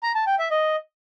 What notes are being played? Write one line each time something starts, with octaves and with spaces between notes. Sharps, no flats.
A#5
A5
G5
E5
D#5